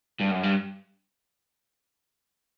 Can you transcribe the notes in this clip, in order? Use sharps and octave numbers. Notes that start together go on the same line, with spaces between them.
G2
F#2
G2